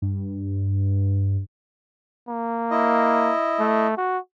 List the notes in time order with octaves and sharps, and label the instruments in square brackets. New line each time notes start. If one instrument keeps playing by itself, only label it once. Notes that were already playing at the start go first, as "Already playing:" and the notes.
[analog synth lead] G2
[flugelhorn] A#3
[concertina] E4 D#5
[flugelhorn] A3
F#4